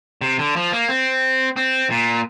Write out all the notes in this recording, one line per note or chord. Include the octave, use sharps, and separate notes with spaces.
C3
D3
F3
A#3
C4
C4
A#2